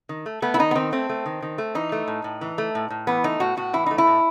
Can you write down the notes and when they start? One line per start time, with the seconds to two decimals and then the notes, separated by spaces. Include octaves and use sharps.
0.09 D#3
0.26 A3
0.42 A3 B3
0.54 E4
0.59 D#3 D#4
0.71 B3
0.75 D#3 C4
0.92 A3 C4
1.09 A3
1.26 D#3
1.42 D#3
1.58 A3
1.75 E3 D#4
1.92 A3
2.08 A2
2.24 A2
2.41 E3
2.58 A3
2.75 A2
2.90 A2
3.07 E3 B3
3.24 A3 D#4
3.40 A2 F#4
3.57 A2 F#4
3.73 E3 E4
3.86 A3 D#4
3.98 E4
4.07 A2